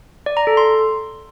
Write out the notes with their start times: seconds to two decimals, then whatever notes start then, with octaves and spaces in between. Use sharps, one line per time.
0.26 D5
0.37 A#5
0.47 A4
0.57 C6